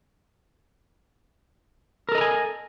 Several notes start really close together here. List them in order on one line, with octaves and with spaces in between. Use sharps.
A#4 A4 D#5 A#5 G#5